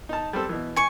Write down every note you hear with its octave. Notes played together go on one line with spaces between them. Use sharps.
D#4 A5
G3 C4 A4
B2 E3
G#5 C#6